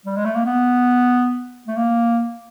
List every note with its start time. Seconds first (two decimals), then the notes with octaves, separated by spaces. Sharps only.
0.06 G3
0.16 G#3
0.25 A3
0.35 A#3
0.45 B3
1.67 A3
1.77 A#3